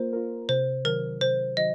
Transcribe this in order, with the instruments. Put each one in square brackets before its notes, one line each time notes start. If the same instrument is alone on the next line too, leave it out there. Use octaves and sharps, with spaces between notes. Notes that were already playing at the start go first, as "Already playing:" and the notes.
Already playing: [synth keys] A#3 F4 A#4 [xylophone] C5
[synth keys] F4 A#4
[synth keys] C3 [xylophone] C5
[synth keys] D#3 F#3 [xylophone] A#4
[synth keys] C3 [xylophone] C5
[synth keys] D#3 F#3 [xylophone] D#5